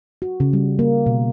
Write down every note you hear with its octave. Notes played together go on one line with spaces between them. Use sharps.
F#4
C#3
G3
A#3
B2